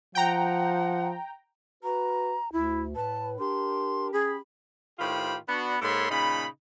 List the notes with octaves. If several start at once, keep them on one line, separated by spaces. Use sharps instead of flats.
F3 F#5 G5 A#5
F#4 B4 A#5
D2 E4
A2 B4 A5
D4 G4 A#4 C6
C#4 G4 G#4 B5
A2 D#3 F4 G4 C5 B5
B3 D4 F#4
G#2 A#3 A4 C#5 B5 C6
A#2 C#3 D#4 B5